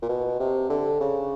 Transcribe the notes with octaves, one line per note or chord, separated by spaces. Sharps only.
A#2
B2
C3
D3
C#3